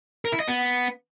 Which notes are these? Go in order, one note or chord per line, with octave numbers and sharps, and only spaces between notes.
A#4
E4
D#5
B3